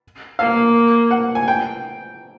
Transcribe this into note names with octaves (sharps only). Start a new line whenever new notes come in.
A#3 F5
F#5
G#5
G5